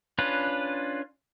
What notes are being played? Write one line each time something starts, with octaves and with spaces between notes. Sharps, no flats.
C#4 D4 F4 B4